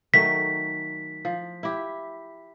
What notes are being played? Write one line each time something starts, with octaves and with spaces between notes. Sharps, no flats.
D#3 F#3 A3 B6
F3
E4 G4